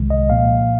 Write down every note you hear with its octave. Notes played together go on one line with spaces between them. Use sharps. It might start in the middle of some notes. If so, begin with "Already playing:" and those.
Already playing: C2 C3 D#3 G#3
D#5
A#2 F3 A#3 F5